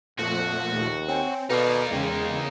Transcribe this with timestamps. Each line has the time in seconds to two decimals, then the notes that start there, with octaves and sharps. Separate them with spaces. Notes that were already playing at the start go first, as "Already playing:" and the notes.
0.19 F2 A#2 F3 A3 F#4
0.72 D#2
1.08 C4 C#5 G5 G#5
1.50 B2 A#3 D#4 A4 B4 D5 F5
1.91 E2 C#3 G#3 D#5 F5 G5